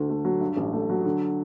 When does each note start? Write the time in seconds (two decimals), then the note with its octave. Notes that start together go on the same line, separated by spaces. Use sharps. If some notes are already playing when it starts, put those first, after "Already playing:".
Already playing: D2 D3
0.09 A3
0.25 F#3
0.41 G2
0.57 A1
0.73 A3
0.90 F#3
1.05 D3